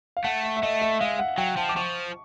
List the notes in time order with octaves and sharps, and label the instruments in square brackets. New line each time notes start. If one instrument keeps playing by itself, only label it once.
[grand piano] F5
[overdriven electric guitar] A3 [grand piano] F#5
[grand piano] E5
E5
[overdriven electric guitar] A3 [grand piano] D#5
[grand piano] E5
[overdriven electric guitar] G#3 [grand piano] F5
[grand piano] F#5
[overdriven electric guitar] F#3 [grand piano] G5
[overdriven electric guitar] F3 [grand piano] A5
[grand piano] D6
[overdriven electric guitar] F3 [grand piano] C#6